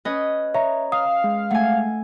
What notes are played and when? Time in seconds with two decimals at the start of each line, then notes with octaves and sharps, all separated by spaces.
0.05 C#4 B4 D#5
0.54 C#5 E5 A#5
0.92 F5 D#6
1.24 G#3
1.51 A3 F#5 G#5